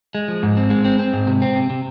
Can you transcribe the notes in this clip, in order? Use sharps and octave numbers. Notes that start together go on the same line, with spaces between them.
G#3
F3
G#2
C4
G#3
C4
C4
G#2
C3
C4
C3
C3